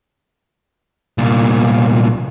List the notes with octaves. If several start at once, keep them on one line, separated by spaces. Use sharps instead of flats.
C2 A#2